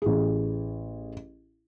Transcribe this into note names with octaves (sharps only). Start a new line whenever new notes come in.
A1 G#4